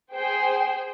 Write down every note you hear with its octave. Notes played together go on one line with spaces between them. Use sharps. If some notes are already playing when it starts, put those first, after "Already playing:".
G#4 C5 G5